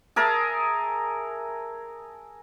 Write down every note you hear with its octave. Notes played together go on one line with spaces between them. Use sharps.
G#4 A#4 E5 A5